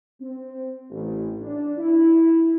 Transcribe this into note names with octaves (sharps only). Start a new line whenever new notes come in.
C4
A1
D4
E4